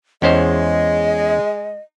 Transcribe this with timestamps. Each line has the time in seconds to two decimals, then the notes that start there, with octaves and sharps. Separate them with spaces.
0.22 E2 G#3 C#4 C5 D#5